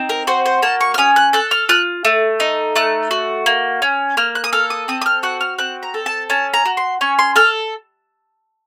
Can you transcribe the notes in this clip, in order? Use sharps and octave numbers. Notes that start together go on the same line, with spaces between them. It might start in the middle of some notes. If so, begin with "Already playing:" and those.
Already playing: C4 D#4
A#4
F#4 C5
C5
A#3 A5
C#6
F6
C#4 D#6
F#6
A4 F#6
F6
F4 F#6
A3
D#4
A3 F#6
F#4
A#3
C#4
A#3 F6
F#6
D#6
A4 F6
D#6
C4 D#6
D#6
F6
F#4 F#6
F6
C4 F#6
A#5
A4
A5
C#4 A5
A#5
F#4
C6
C#4 C#6
C6
A4 F6